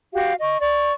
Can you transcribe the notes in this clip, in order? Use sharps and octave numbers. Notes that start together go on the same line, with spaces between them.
F#4 G4 F5
D#5 C#6
D5 C#6